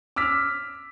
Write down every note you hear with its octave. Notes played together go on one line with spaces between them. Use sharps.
D6 E6 F6 B6